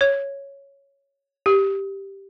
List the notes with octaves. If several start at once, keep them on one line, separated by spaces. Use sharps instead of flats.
C#5
G4